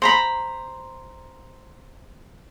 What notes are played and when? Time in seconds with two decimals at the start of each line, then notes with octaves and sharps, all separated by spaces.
0.02 C5 A#5 B5